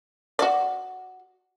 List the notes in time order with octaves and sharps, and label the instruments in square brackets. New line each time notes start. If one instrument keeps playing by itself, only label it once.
[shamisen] F#4 D5